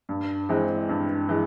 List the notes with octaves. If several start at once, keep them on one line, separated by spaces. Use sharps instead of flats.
G2
E3 G#3 C4
G2
E3 G#3